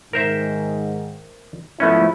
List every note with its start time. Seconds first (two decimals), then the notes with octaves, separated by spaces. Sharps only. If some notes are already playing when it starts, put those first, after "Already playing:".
0.13 G#2 D#3 A#4 C5 E5
1.80 G#2 F3 A3 B3 C#4 E4